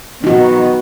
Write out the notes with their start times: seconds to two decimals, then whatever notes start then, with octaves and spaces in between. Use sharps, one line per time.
0.24 B2 D#3 D#4 F#4